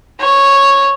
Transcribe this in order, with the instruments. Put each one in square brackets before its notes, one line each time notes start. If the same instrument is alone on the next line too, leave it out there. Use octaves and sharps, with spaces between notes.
[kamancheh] C#5